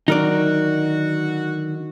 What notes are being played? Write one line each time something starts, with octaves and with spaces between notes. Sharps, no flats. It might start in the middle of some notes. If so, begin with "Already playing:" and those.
D3 D#3 F#3 D#4 F#4 A#4 D5